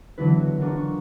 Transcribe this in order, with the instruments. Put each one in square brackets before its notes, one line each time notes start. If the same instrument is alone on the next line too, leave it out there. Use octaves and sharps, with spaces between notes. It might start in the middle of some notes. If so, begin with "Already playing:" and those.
[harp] D3 E3 F#3 B3 E4 B4
F#4
D4 F4 F#4 A#4
C#6